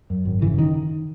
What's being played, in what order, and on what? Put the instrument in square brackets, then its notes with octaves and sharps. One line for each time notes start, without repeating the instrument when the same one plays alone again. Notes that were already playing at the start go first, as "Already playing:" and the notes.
[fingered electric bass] F#2
G#1
C#3 E3
D#3